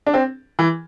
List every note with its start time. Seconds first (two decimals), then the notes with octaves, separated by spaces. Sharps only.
0.07 D4
0.14 C4
0.59 E3